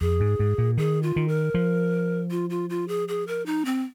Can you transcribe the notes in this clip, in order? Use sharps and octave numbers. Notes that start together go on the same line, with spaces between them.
F2 G#4
G#2
G#2
A#2
D#3 G#4
F4
D#3
A#4
F3
F4
F4
F4
G#4
G#4
A#4
D#4
C4